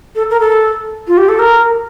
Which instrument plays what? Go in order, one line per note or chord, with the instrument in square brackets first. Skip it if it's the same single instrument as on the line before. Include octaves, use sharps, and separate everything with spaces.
[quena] A4
A#4
A4
F4
G4
A4
A#4